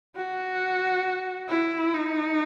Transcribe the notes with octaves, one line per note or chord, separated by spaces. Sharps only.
F#4
E4
D#4